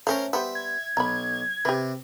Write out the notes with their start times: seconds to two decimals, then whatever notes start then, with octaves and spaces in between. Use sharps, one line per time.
0.07 A3 C#4 A#4 C5 C#5
0.33 G3 B3 C5 E5
0.55 G#6
0.97 B1 A#5 B5
1.65 C3 G4 B4